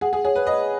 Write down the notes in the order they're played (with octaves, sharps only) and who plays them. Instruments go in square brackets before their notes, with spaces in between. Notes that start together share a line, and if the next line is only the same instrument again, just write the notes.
[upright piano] G#4 [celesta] F#5
[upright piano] G#4
[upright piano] G#4 [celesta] C#5
[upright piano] B4
[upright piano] D#5 [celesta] B5